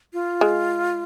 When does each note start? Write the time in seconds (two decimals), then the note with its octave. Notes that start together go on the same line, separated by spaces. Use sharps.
0.13 F4
0.41 G#3